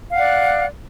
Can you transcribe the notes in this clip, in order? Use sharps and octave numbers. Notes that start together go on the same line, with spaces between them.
D5 F5 F#5 F#6